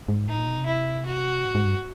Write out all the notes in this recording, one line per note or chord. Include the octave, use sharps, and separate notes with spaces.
G#2
A2 D#4
A#2
B2
C3
E4
F#4
A2
G#2
G2